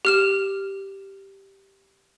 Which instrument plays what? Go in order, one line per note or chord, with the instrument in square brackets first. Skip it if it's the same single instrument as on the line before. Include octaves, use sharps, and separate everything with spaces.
[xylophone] G4 F6 E7